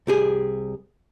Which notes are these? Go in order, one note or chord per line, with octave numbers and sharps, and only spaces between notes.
C2 G4 G#4